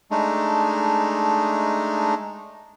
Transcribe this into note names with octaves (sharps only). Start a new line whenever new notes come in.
G#3 A3 D4 D#4